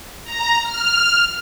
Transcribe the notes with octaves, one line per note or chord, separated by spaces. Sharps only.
A#5
F6